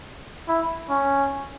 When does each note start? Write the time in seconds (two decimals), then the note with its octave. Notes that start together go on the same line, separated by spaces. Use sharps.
0.48 E4
0.90 C#4